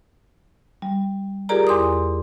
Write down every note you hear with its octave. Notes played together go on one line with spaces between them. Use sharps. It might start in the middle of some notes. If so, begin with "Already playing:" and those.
G3
F4 G4 G#4 A#4 D5 A#5
E2 C6 D6 D#6